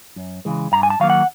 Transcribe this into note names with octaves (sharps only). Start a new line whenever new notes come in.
F#2
C#3 E3 G#3
G2 A#5
G#5
A5
D#3 F#3 A#3 F5
F#5